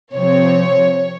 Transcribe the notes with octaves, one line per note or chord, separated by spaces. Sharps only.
C3 F3 C4 C#5